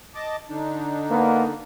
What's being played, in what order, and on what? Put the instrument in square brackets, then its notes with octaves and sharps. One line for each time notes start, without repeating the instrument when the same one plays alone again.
[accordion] D#5 A5 D6
D3 D4 D#4
[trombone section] A#3 B3